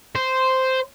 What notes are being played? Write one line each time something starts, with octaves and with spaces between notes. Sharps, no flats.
C5